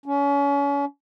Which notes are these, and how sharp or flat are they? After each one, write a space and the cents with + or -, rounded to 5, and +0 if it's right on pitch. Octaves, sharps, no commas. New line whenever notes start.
C#4 +35